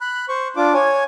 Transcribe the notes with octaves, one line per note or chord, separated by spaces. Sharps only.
B5 F#6
C5 C#6
D4 F4 D6
C#5 G#5